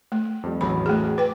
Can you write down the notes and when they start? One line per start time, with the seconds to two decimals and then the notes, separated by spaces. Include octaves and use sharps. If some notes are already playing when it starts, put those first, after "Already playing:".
0.12 A3
0.43 F2 G3
0.61 A1 E2 F#3 B5
0.86 A3 G#4
1.18 B4 G5 D6